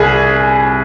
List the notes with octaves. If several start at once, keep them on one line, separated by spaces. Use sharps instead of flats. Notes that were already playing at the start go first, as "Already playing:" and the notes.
Already playing: C2 G#4